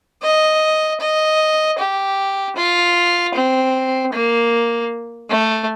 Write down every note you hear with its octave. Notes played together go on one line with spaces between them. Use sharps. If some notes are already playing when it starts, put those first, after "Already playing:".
D#5
D#5
G4
F4
C4
A#3
A3